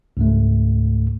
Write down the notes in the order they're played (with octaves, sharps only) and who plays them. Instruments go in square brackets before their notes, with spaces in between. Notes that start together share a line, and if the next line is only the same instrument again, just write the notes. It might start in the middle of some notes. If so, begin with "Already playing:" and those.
[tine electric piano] C#2 G#2 A3